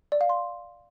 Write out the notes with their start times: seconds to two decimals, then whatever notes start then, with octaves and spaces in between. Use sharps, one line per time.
0.12 D5
0.21 F5
0.29 C6